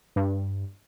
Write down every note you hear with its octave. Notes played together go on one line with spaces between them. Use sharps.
G2